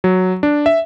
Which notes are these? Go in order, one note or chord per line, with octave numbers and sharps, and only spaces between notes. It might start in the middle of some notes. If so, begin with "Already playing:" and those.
F#3
D4
E5